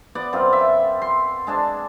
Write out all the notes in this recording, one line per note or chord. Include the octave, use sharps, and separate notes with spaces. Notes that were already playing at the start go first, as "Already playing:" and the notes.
B3 D5 F#5
F#2 C4 F4
E5
C6
G#3 D4 A5